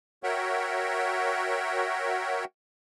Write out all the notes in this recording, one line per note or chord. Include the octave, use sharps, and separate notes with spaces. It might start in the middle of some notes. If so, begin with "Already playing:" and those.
F#4 A#4 C#5 E5 F#5 G5